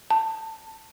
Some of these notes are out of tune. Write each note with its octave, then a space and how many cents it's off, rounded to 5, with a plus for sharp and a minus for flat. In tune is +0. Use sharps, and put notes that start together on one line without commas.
A5 +15